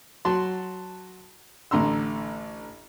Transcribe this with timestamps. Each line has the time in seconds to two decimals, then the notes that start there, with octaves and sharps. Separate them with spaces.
0.25 F#3 F#4 A5 C6
1.71 A1 D3 A#5 C6 E6